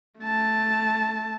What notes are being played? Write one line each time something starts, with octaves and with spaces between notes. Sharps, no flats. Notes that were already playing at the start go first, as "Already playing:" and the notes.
A3 A5